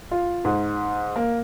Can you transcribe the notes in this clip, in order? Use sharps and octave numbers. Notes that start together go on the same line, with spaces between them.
F4
G#2
A#3